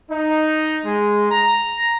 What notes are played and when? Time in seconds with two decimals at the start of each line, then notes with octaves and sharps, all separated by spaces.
0.10 D#4
0.85 G#3
1.30 A#5